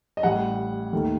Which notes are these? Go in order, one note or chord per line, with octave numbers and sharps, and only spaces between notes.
D#5
A1 A2 G3 F#5
D#2 D#3 A3